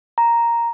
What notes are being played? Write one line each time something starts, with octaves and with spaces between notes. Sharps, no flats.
A#5